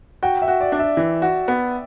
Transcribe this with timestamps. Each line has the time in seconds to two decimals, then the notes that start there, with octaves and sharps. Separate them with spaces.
0.23 F#4 G5
0.42 E5
0.48 F#4
0.60 D5
0.72 D4
0.79 E5
0.97 E3
1.22 F#4
1.48 B3